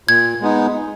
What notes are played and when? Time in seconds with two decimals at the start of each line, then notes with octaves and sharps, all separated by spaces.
0.08 A#2 G#6
0.41 G#3 B3 D#4